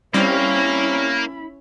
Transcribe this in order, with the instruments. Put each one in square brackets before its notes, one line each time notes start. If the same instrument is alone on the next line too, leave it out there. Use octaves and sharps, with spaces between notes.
[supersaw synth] G3 C4 [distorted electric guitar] A#3 [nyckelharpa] C#4 [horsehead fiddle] E4 B5